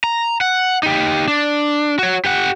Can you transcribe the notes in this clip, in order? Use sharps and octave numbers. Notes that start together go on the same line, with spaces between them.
A#5
F#5
D#4 G4
D4
F#4 C#5
G4 F#5